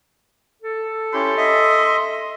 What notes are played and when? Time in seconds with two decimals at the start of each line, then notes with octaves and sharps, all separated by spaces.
0.62 A4
1.14 C#4 E4 G4 C6
1.37 D#5 E5